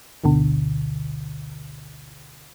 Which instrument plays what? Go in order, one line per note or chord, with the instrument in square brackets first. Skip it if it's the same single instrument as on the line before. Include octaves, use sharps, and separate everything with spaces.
[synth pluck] G#1 D2 B2 D3